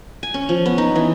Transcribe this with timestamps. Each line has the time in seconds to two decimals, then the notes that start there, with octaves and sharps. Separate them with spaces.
0.23 G#5
0.34 C#4
0.49 F3
0.66 B3
0.78 D#4
0.95 E3